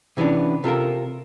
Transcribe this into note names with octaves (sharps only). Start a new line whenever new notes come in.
C3 E3 B3 C#4 D4
C3 F4 A4 A#4